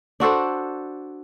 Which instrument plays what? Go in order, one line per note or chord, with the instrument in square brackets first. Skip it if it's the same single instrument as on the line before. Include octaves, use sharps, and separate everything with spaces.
[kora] D4 F#4 A4 C5